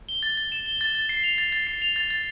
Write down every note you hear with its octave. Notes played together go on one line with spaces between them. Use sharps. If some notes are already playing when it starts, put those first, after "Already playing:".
G7
A6
A6
E7
G7
A6
A6
C7
F7
A6
A6
C7
F7
A6
A6